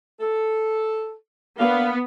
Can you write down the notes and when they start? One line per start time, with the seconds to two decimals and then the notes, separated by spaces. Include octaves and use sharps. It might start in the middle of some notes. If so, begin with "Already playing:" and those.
0.20 A4
1.60 A#3 B3 D4 F5